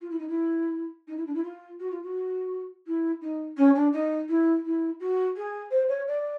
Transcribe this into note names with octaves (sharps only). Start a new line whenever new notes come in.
F4
E4
D#4
E4
D#4
E4
D4
E4
F4
F#4
F4
F#4
E4
D#4
C#4
D4
D#4
E4
E4
F#4
G#4
C5
C#5
D5